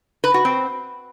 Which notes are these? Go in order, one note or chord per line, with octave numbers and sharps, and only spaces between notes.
B4
F#4
C4